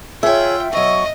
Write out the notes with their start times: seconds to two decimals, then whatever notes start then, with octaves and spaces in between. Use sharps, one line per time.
0.23 F4 G#4 C#5 E5 G5
0.73 B2 F#3 D#5 C#6